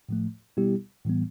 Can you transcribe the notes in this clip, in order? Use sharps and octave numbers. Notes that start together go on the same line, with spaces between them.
A2 F3 A3
B2 G3 B3 E4 G4
A2 E3 G3 B3